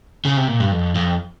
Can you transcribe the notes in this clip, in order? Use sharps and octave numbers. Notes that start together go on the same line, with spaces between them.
C#3
C3
A#2
G2
F2
F2